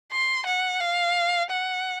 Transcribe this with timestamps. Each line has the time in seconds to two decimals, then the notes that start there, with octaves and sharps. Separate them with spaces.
0.11 C6
0.46 F#5
0.81 F5
1.50 F#5